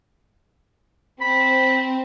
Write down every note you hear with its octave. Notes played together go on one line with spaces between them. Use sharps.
C4 B5